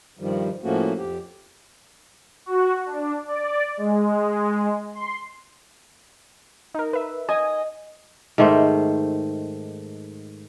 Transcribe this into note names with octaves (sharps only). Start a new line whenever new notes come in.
G2 D#3 F3 G3
A2 F3 A3 A#3 C#4 F#4
F2 G4
F#4
D4
D5
G#3
C6
D#4 A#4
B4 E5
D#5 G#5
G#2 D#3 A3 C5